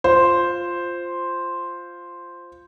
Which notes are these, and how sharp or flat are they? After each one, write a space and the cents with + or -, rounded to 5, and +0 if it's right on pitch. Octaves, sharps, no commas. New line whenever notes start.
F4 +0 C5 +0